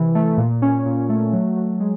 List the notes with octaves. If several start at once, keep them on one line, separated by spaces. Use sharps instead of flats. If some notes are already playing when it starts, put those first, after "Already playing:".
Already playing: C3 E3
A3
A#2
C#4
A#2
A3
F#3
F#3
G#3